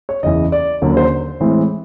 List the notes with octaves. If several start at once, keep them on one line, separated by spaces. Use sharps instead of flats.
C#5
F#1 E2 C#3 E3 D#5
D5
D#2 D3 F#3 A#3 C#4
C5
A2 E3 G#3 C4